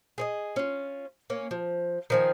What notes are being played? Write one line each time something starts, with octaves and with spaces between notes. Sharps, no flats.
G#4 C#5 D#5
C#4 F4
A#3 C#4
F3
D#3 F3 G#5